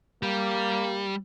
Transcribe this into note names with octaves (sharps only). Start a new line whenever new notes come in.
G3 A#3